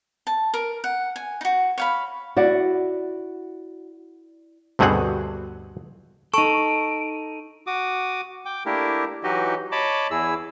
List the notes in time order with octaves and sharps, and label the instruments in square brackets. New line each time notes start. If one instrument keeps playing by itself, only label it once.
[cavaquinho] A5
A#4
F#5
G#5
D#4 F#4
C#5 F5 B5
[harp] E4 D5 F#5 [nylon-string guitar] F#4
[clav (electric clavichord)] D2 G2 B2 C4 G#4 F#5
[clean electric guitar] D#4 A4 [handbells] C#6 [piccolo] D7
[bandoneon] F#4 D6 D#6
G5 D6
A3 A#3 D4 E4 G4 A#4
E3 F#3 D#4 F#4 G4 D#5
C#5 D#5 A5 B5 D6
E2 E4 G#4 E6